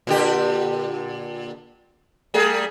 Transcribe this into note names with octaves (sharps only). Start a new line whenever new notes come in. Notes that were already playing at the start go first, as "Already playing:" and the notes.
A#2 D3 G4
G3 A3 G#4